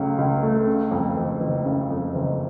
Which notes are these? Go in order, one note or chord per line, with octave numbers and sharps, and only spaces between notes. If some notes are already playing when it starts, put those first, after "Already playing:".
Already playing: C#2 C#3 F#3 A3
C#2
A3
C#3
F2
F#1
F#1
C#3
F2
F#1